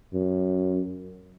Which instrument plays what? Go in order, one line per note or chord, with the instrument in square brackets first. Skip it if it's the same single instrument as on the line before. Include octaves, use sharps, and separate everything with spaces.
[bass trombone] F#2